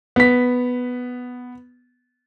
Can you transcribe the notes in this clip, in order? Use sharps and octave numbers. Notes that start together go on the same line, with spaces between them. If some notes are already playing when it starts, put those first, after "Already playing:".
B3 B6